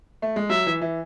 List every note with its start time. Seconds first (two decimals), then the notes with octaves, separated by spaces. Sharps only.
0.22 A3
0.36 G#3
0.50 F#3 E5
0.66 E3
0.81 E3